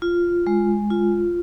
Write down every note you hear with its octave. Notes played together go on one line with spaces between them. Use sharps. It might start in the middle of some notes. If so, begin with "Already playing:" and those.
F4
G#3
F4